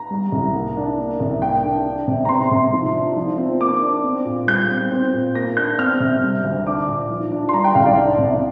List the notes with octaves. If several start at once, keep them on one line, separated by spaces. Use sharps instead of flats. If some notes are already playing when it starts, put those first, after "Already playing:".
Already playing: A#5
G3
C2
A#3
D4
A#3
C2
A#3 G5
D4
D4
C3
A#5
C4 C6
C3
F3
D4
F3
C4
A#3 D6
D4
C4
A#2
G3 G6
C4
C4
A#2
A#3 A#6
D4 G6
C4 F6
C3
G3
D2
D4 D6
A#2
F3
D4
C6
G3 A#5
G5
C2 F5
D5
D4
C3